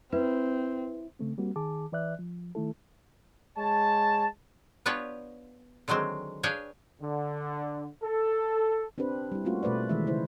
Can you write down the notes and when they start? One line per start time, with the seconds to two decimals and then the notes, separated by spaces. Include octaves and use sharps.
0.13 C4 E4 B4
1.19 C#3 A3 C4
1.38 G3 A#3 C4 F#4
1.56 D#3 G#4 A5 D6
1.92 E3 B4 D5 E5 F#6
2.19 F3
2.55 D#3 A3 E4 A4
3.58 G#3 C#5 A5
4.86 B3 D4 F4 G4 B4 C#5
5.88 D3 D#3 F#3 G#3 C4
6.43 D4 G#4 B4 C#5 F5 G5
7.01 D3
8.04 A4
8.98 C4 D4 G4 B4 C5
9.32 G3 E4
9.45 G3 A3 A#3 C#4 F4 F#4
9.63 B2 A3 B4 C5 D5
9.89 D#3 E3 G#3 A3 E5
10.06 C#3 E4 C5